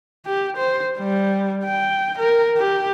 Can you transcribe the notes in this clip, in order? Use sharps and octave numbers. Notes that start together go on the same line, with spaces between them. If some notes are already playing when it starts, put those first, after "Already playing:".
G4
C5
G3
G5
A#4
G4